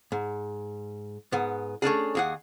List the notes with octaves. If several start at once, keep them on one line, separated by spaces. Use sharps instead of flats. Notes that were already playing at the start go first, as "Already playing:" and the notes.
G#2
G#2 B3
A3 C#4 D4 G#4
D#2 G#4 F#5